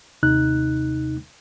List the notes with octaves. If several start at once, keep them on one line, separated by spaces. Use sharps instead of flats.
D#2 C3 D#4 F#6